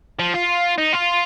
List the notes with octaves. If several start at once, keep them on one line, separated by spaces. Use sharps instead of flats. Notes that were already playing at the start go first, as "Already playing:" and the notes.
F3
F4
D#4
F4